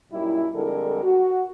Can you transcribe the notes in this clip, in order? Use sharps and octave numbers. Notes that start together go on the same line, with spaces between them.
F#2 A#2 G3 D#4 E4
F2 D3 G3 G#3 A4 A#4
F#4